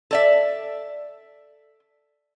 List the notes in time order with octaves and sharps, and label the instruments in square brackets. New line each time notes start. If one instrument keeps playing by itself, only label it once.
[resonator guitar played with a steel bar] A4 D5 E5